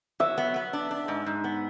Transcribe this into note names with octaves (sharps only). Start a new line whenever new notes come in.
F#3 E5
B3
B3
D4
D4
G#2
G#2
B3